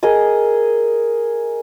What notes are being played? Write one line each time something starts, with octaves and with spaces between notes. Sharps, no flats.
G#4 A#4 D#5 D#6